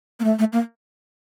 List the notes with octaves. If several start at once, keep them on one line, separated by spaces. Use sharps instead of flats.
A#3
A3
A3
A#3